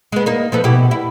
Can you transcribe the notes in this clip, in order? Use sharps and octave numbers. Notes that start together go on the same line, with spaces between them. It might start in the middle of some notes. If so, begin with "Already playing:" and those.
G#3 B3
A#3 D#4
F3 B3 A4
B2 E4 G4
E4